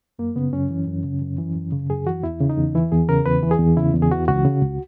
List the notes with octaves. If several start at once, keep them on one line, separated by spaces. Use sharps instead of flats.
F#2 A#3
C#3 B3
F#2 C#4
E3
F#2
C#3
F#2
E3
F#2
C#3
F#2 G#4
E3 F#4
E2 E4
C#3
D#4
E2
E3 E4
E2 G#4
C#3 A#4
E2 B4
E3
G#4
E2
C#3 E4
E2
G#4
E3 F#4
C#2 F#4
C#3
C#2